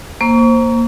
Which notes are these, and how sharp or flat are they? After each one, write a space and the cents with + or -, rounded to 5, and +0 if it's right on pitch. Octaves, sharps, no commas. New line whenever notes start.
A#3 +0 C5 +15 C#6 +35